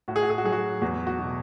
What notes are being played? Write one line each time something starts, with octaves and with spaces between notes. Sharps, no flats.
A2 F#4
G#4
F#4
G#4
F#4
F#3 G#4
F#4
E2 F#4
F#4
B2